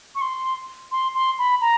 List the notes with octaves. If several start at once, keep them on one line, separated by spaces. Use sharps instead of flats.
C#6
C6
C6
C6
B5
A#5